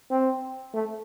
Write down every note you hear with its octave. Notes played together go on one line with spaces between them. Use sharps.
C4
A3